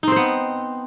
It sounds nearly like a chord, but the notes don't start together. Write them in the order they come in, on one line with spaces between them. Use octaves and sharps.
D#4 C4 C5 B3